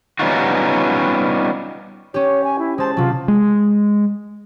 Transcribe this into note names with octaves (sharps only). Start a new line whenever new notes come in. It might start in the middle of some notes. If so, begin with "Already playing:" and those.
G3 B3 C#4 D#4 F4 F#4
C#4 G4 C#5
G#5
E4
G#3 C5 A5
C3 F#3 F4
G#3